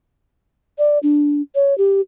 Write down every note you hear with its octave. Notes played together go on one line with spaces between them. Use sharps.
D5
D4
C#5
G4